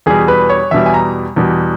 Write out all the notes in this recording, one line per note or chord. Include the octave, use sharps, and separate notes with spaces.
E2 B2 G3 G#4
B4
C#5
E2 B2 G3 E5
G#5
A#5
E2 B2 G3